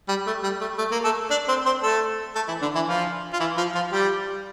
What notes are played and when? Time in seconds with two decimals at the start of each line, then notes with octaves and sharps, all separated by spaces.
0.09 G3
0.26 A3
0.43 G3
0.61 A3
0.78 A3
0.92 A#3
1.04 A3 A4
1.31 D4 D5
1.48 C4 C5
1.66 C4 C5
1.83 A3 A4
2.35 A3 A4
2.48 E3 E4
2.62 D3 D4
2.75 E3 E4
2.88 F3 F4
3.33 F4
3.40 E3 E4
3.57 F3 F4
3.75 F3 F4
3.92 G3 G4